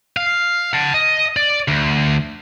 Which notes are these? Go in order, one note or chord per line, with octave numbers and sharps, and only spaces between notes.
F5
F#5 A5
D#5
D5
D2